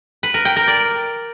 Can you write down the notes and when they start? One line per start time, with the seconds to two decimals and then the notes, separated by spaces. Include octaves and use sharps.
0.23 B4
0.34 A#4
0.45 G5
0.56 A#4
0.67 D5